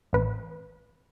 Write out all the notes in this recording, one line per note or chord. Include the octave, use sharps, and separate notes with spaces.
A1 B4